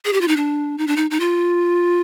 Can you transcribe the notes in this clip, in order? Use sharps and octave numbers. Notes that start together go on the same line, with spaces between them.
G#4
G4
F4
D#4
D4
D#4
D4
D#4
D#4
F4